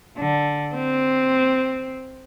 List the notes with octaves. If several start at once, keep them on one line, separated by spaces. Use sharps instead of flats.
D3
C4